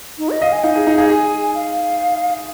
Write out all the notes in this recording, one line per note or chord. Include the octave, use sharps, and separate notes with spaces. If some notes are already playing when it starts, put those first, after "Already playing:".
D#4
D#5
D#5 F5
G#5
D#4 F5
G#4
D#4
G#4
G#4 G#5
F5